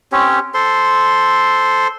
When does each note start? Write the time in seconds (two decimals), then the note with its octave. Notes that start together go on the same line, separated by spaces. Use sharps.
0.12 C4 C#4 G4 C#5
0.54 A4 C5 C6